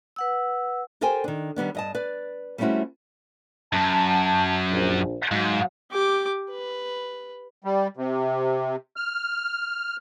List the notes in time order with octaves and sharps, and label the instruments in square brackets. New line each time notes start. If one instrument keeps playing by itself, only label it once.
[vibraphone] B4 F#5 E6
[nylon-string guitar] G4 A4 A#4 C5 G5 G#5
D#3 D4
D#3 G3 B3 D4
G2 D#5 A5
B4 D5
G3 A3 C4 C#4 E4 F#4
[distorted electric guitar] F#2 [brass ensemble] A5
[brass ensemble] A#1
[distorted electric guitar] G#2 [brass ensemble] F#3 F5
[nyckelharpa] G4 D6
B4
[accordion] G3
C3
F6